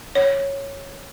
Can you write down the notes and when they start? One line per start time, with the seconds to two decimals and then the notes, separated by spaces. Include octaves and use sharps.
0.15 C#5